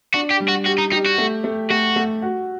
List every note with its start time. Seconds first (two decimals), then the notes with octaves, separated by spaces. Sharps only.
0.14 D4 F#4
0.31 G4
0.40 G3
0.49 F#4
0.66 F#4 G4
0.78 D#4
0.92 D#4 G4
1.06 F#4
1.18 A3
1.44 A3
1.70 A3 F#4
1.96 A3
2.22 F#4